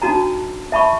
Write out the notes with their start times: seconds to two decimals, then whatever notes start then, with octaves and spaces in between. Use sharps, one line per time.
0.02 D4 D#4 F#4 A5 A#5
0.72 E5 A5 B5 C#6